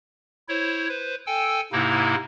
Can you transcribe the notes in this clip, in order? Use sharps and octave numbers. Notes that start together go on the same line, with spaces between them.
E4 C5 C#5
B4 C5
A4 G5 G#5 E6
G#2 C3 A#3 D#4 E4